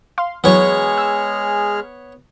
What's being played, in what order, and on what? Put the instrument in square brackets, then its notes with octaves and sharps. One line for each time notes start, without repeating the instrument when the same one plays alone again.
[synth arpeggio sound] F5 C6
[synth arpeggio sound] E3 F#3 [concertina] G#3 G#4 F6 [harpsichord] B3 C#5 C#6
[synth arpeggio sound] E6